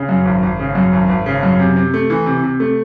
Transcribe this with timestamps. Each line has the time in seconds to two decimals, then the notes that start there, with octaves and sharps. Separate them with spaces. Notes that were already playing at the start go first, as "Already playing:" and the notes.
Already playing: C#3
0.09 F#2
0.25 G#1
0.43 G#1
0.59 C#3
0.75 F#2
0.93 G#1
1.09 G#1
1.26 C#3
1.43 F#2
1.59 C3
1.76 C3
1.94 A3
2.10 E3
2.26 C3
2.43 C3
2.60 A3